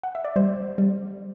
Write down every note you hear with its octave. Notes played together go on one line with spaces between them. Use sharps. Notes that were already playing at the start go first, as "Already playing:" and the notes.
F#5
E5
D5
G3 C5
G3